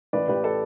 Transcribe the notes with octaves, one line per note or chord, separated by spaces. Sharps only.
A1 B4 D5
A1 G4 B4
A4